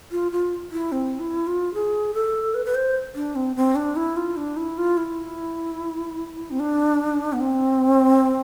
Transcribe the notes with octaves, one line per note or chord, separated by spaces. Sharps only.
F4
F4
E4
C4
E4
F4
G#4
A4
B4
B4
C5
D4
C4
C4
D4
E4
F4
D4
E4
F4
E4
C4
D4
B3
C4